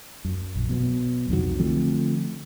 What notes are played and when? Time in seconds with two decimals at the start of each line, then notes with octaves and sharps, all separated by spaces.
0.25 F#2
0.55 A#1
0.69 B2 F#3 B3
1.29 C2 F2 D#3 F#3
1.59 D3 F3 A3 C4